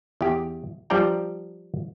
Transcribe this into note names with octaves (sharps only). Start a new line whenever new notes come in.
E2 G4
F3 G3 D4 D5 G5 A#5